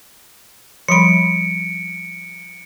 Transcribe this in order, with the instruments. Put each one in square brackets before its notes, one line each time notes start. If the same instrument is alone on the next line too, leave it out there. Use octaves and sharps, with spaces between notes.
[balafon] F3 G3 B5 [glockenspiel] C#7 D7